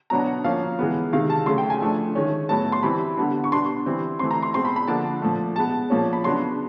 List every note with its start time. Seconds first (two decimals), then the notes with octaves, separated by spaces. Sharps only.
0.10 B2 F#3 B3 D4 A#5
0.27 F#5
0.44 F3 A#3 C#4 F5
0.79 E3 G#3 B3
1.13 C3 D#3 G#3 F5
1.30 A5
1.46 C#3 F#3 A3 C6
1.58 G5
1.70 G#5
1.81 F3 A3 D4
2.15 D#3 G#3 C#4
2.49 A2 F#3 B3 A5
2.72 C6
2.83 E3 G3 C4 B5
3.17 D3 G3 B3 D4
3.44 C#6
3.52 B2 G3 B3 D4 C6
3.86 E3 G3 C4
4.19 E3 A3 C4 C6
4.31 A#5
4.42 C6
4.54 B2 G#3 C4 C6
4.65 B5
4.76 B5
4.88 D3 F3 A#3 D4 A5
5.22 A#2 F3 A3
5.56 B2 G#3 B3 A5
5.90 A#2 F3 A#3 C#4
6.13 B5
6.24 C#3 F#3 B3 D4 C6